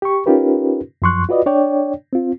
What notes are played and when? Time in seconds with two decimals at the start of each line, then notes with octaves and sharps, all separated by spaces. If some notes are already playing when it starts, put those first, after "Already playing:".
0.02 G4 C#6
0.26 C#4 D#4 F4 G4 A#4 B4
1.02 F#2 F3 C6 C#6 F#6
1.29 F4 F#4 B4 D5 D#5
1.46 D4 C#5 D5 G5
2.13 C4 F4